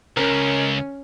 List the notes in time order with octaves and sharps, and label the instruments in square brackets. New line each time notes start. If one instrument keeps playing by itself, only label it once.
[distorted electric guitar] C#2 [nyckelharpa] C#4 [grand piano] A#4